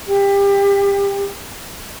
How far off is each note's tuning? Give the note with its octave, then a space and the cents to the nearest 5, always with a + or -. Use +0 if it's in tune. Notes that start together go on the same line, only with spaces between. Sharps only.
G4 +25